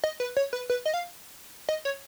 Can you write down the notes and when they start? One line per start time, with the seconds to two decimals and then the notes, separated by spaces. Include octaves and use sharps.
0.04 D#5
0.20 B4
0.37 C#5
0.53 B4
0.70 B4
0.86 D#5
0.94 F5
1.69 D#5
1.85 C#5